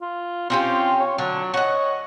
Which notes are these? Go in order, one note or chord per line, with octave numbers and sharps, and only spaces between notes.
F4
C4 C#4 F4 G4
C#5
D3 F#3
C#5 D#5 F#5